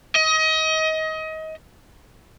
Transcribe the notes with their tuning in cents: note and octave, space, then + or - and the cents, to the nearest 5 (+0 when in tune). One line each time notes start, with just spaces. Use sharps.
D#5 +25